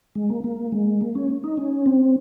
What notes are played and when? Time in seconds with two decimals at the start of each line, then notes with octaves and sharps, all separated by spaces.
0.15 G#3
0.30 A#3
0.44 A#3
0.72 G#3
1.01 A#3
1.15 C#4
1.44 D#4
1.57 C#4
1.86 C4